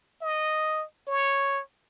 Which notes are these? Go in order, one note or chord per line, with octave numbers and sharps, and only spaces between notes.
D#5
C#5